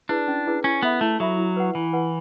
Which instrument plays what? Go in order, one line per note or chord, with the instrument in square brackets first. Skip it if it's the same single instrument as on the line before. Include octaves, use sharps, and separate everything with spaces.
[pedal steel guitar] D4 [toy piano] E4 G#4 B4 D5
[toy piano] C#4
E4 G#4 B4 D5
[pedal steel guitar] C#4 [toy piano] E4
[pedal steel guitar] B3 [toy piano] A4 E5 B5
[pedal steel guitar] A3 [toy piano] E4
[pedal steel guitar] F#3 [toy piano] A4 E5 B5
[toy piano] E4
B4 F#5
[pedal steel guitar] E3 [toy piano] E4
[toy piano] B4 F#5